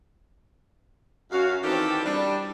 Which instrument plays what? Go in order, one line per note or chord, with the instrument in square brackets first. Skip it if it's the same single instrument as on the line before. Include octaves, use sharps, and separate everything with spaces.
[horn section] F#2 C#4 F#4 F5
D#3 E3 C4 G4 A4 D5
G3 D4